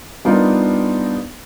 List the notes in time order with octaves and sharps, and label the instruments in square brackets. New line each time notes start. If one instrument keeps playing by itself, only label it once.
[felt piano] G3 B3 D4 D#4 F4 A#4